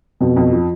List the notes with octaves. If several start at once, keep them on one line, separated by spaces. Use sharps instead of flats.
F2 B2
F2
F3